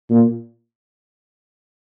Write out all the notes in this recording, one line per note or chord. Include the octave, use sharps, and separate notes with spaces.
A#2